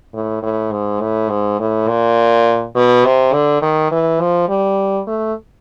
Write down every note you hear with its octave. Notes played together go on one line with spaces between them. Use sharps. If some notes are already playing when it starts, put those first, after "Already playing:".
A2
A2
G#2
A2
G#2
A2
A#2
B2
C3
D3
D#3
E3
F3
G3
A3